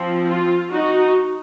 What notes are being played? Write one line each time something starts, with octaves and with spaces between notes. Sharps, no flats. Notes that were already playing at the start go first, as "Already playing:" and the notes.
Already playing: F3 C4
F4
D#4 F#4